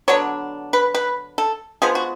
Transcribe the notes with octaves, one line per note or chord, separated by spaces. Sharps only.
D3 F#3 B3 D4 C#5
B4
B4
A4
F3 G#3 B3 G#4
F#4